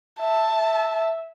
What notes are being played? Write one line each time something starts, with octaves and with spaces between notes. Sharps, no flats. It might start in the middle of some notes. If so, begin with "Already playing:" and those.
E5 A5